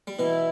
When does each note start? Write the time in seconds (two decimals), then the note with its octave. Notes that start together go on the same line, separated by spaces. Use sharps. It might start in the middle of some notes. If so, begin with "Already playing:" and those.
0.07 G3
0.19 B2 E3 E4